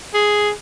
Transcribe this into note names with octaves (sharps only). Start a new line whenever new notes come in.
G#4